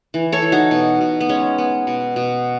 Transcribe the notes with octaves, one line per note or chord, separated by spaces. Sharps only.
E3
A4 C#5
E3
D#4 F#4
B2
B2
B3
G#3 C#4
B3
B2
B2